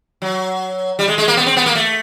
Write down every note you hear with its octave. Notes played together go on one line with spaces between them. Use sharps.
F#3
G3
G#3
G#3
A#3
B3
C4
B3
A#3
A3